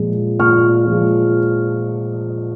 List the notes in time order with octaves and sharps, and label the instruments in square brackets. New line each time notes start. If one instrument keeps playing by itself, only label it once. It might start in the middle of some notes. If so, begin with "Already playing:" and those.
Already playing: [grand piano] A#2 F3 G#3
A#2 C#6 F6
F3 G#3